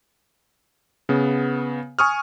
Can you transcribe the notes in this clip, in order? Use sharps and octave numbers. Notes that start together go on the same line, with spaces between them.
C#3 B3
G#5 C#6 D#6 F6